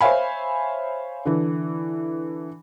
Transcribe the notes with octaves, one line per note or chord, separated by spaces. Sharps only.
C5 C#5 E5 F5 G#5 B5
D3 E3